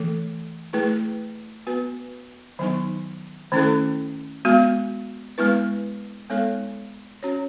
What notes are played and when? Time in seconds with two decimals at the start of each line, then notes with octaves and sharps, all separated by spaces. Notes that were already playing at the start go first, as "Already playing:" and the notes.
Already playing: E3 A3 A4
0.73 A3 E4 G#4 B4
1.67 B3 F#4 B4
2.59 D#3 F#3 B3 D#4
3.52 D#3 A3 C#4 E4 A4
4.45 G#3 B3 F#4
5.38 G#3 B3 E4 B4
6.30 G#3 B3 D#4 A4 C#5
7.23 C#4 F#4 C#5